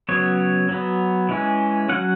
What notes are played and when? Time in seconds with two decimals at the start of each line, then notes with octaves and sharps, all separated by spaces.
0.09 C#3 F#3 B3 C#5
0.69 F#3 B3
1.29 E3 G#3 C#4
1.89 F#3 C#4 F#5